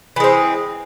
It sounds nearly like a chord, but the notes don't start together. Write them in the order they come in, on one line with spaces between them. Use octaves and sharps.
E3 G#3 C4